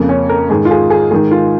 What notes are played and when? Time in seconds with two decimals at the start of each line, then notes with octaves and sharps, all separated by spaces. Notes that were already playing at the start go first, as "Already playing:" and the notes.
Already playing: F2 C#3 A#3
0.09 C#4
0.29 A#4
0.50 G#2 D#3 G#4
0.65 F4
0.71 G#4
0.90 G#4
1.11 G#2 D#3 G#4
1.31 F4